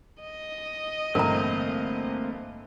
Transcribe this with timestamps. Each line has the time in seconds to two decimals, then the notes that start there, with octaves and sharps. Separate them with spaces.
0.22 D#5
1.15 A1 G2 D3 A3 A#3 C4 A#4 A#5